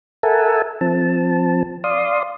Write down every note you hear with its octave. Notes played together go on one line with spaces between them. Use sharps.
A4 A#4 E5 F#5 G#5 A5
F3 C4 A5
D5 F5 C6 D#6